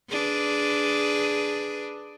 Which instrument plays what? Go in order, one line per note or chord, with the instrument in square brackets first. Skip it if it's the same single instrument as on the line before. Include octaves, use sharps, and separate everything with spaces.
[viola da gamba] D4 G#4 B4